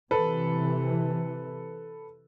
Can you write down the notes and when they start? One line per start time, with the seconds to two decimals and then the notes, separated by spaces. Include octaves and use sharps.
0.11 C3 E3 A4 B4